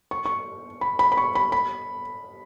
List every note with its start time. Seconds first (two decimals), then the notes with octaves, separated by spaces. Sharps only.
0.11 C#6
0.25 C#6
0.81 B5
0.99 B5
1.12 B5
1.17 C#6
1.35 B5
1.52 B5